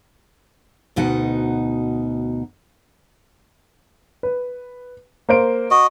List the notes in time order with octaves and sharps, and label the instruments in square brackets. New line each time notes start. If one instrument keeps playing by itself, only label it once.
[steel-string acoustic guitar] D2 B2 D#4 F#5
[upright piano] B4
A#3 C5 D7
[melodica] F#4 D#5